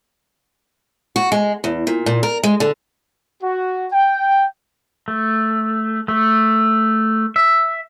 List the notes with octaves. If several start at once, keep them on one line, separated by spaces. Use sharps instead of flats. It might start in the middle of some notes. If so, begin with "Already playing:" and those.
F#4
G#3
E2
A#2
A#2
A#4
G#3
D3
F#4
G5
A3
A3
E5